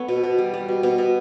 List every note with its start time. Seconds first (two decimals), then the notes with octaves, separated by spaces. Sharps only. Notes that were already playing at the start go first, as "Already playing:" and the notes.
Already playing: B3 A4 C#5
0.08 B2
0.23 B2
0.38 G3
0.54 G3
0.68 B2
0.83 B2
0.98 B2